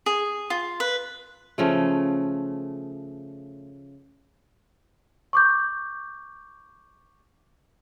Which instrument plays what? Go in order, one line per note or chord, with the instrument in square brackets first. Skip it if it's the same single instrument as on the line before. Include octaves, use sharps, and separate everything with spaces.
[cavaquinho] G#4
F4
B4
[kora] C#3 F3 A3
[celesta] C#6 D6 G6